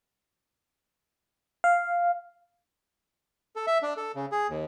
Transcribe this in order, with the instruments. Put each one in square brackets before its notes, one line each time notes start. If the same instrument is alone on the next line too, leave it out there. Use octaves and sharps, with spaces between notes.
[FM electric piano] F5
[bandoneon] A4
E5
D4
A4
C#3
G#4
D#2